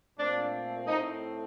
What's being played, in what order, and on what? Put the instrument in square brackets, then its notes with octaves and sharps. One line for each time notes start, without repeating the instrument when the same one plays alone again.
[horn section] A#2 A3 C4 D4
A2 A3 C4 D#4